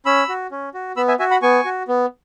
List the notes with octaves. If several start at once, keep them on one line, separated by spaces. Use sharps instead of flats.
C#4 B5 E6
F#4
C#4
F#4
B3 B5 E6
E5 G#5
F#4 E5 G#5
F#5 B5
B3 G#5 C#6
F#4
B3